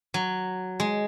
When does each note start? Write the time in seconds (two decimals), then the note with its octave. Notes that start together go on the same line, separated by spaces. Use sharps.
0.14 F#3
0.80 G#3